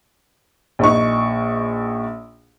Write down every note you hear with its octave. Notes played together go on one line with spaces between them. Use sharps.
A#1 D#4 C#6